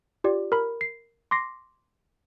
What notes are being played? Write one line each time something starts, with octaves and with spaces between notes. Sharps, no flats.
F4 G4 D5
A#4 B5
C7
C6 D6 A#6 C7